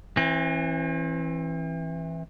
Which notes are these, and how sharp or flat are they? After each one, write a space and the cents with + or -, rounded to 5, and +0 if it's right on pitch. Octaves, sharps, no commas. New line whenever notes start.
E3 +0 C4 +45